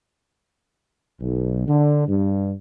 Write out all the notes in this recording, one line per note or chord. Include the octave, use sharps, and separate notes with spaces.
B1
D3
G2